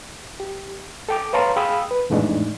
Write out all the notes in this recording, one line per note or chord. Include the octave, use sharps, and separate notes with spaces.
G4
A4 G5 D6
B4 C#5 F5 A5 A#5 C6
G#4 F5 G5 B5 D#6 E6
B4
F2 A2 E3 G#3 D4 D#4